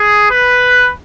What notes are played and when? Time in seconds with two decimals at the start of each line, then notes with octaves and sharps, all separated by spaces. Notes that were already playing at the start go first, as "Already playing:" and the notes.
Already playing: G#4
0.30 B4